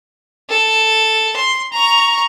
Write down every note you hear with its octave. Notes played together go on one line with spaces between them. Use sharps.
A4
C6
A#5 C#6